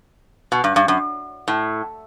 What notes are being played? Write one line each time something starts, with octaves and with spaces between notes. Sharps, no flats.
B2
G2
G2
F#2
A2